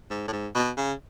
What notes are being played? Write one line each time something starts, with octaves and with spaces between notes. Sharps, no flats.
G#2
A2
G#2
B2
C#3